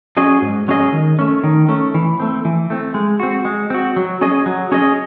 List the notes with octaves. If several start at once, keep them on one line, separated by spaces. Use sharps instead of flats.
F#3 C#4 G#4 D#5
G#2
F#3 C#4 G#4 D#5
D#3
A3 C#4
D#3
A3 C#4
E3
A3 C4
E3
A3 C4
G#3
C4 F#4
G#3
C4 F#4
F#3
C#4 G#4 D#5
F#3
C#4 G#4 D#5